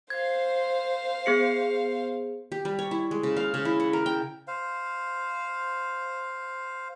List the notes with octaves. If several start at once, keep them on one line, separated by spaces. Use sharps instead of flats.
C5 F5 G#6
B3 G#4 C#7
G4
G3
C#5
E4
G#3
C#3
F5
C#3
E4
F#5
A#4
G5
C5 F5